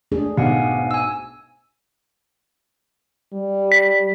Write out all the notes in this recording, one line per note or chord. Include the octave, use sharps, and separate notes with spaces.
A3 D4 G#4
B1 G#2 B3 F5 F#5 G#5
G#5 E6
G3
B6